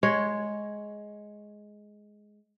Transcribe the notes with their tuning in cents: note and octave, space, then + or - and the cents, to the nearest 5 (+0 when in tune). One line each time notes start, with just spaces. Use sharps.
G#3 +10 C#5 +0